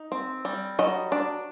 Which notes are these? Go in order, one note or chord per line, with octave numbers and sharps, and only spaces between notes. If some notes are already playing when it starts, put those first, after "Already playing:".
Already playing: D#4
C4
G3
F#3 D#5
D4